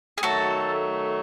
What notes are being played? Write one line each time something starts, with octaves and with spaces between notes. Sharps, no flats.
G#4
D#3 F#3 A3 F#4 A4